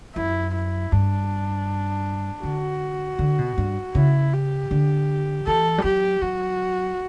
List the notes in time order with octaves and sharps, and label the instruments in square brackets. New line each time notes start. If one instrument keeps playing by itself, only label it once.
[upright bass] F#2 [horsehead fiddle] E4
[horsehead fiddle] E4
[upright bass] G2 [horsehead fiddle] D4
[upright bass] D3 [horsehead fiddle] F#4
[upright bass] D3
B2
G2
[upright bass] C#3 [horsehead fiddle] E4
[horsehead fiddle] G4
[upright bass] D3
[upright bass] E3 [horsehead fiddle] A4
[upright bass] G3
[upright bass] F#3 [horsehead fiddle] G4
[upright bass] F#3 [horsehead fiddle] F#4